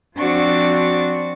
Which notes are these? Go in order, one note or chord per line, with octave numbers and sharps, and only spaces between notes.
F3 C4 D4 F#4 C#6 A6